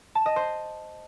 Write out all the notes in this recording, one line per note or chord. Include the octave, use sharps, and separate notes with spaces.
A5
D#5
C5